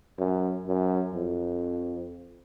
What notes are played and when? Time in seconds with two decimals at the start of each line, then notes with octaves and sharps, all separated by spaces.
0.19 F#2
0.67 F#2
1.14 F2